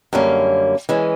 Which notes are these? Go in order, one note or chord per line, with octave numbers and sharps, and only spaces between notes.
F#2 D3 G3 A#3 C#4
E3 G#3 C#4